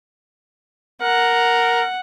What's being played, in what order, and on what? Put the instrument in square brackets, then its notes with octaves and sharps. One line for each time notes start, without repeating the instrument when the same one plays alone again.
[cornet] A#4 [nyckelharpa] F#5